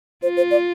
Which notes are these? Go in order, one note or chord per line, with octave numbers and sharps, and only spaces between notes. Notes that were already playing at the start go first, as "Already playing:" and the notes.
F4 C5
C5
D5